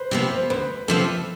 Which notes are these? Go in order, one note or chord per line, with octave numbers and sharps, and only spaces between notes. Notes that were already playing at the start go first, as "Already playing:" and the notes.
Already playing: B4 C5
C3 F3 B3
C5
D2 B4
C3 F3 B3 A4